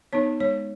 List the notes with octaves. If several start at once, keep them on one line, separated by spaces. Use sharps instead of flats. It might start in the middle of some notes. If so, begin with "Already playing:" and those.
B3 D#4 C#5
G#3 C#5